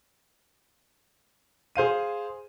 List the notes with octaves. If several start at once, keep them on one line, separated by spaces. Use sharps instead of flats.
G#4 C5 F5 D#7